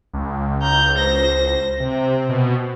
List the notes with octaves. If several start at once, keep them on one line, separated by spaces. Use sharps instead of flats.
C#2
A#5 G6
C5 A#6
C3 C4
B2